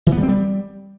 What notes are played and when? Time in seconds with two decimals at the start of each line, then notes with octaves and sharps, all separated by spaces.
0.07 E3
0.12 B3
0.18 G3
0.23 C4
0.29 G3